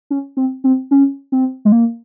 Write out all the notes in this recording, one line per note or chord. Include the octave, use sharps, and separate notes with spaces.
C#4
C4
C4
C#4
C4
G#3
A#3